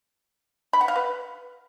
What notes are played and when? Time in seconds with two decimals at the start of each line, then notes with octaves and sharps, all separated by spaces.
0.73 B5
0.81 F#5
0.88 F5
0.96 B4